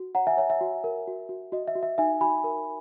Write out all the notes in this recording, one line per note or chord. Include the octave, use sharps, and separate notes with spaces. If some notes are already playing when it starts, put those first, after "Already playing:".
Already playing: F#4
C#5 F#5 A#5
E5 G#5
C#5 E5
E5
F#4
A#4
F#4
F#4
F#4 D#5
E5
F#4
E5
D#4 E5 G#5
F#4 G#5 B5
A#4